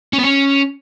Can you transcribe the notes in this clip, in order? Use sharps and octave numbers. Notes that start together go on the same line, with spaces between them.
C#4
B3
C#4